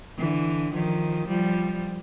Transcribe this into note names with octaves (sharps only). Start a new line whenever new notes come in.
D3 E3
D#3 F3
F3 G3